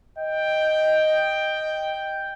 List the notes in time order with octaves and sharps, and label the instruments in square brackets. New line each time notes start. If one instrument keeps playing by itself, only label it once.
[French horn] D#5 [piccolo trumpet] G5